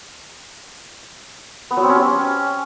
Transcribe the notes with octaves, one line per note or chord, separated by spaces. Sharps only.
B3
F#3
C4
C#4
G4